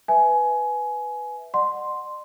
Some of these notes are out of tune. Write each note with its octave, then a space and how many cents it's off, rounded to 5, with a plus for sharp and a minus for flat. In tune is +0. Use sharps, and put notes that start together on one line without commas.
B4 +0 E5 +0 G#5 +20
D5 +45 F#5 +0 C6 +0